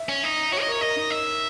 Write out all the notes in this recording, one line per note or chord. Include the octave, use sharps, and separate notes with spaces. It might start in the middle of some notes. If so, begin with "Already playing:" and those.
Already playing: E5
C#4
D#4
F#4 C#5
D#5
A#4 C#5
A#4 D#5
D#4
E5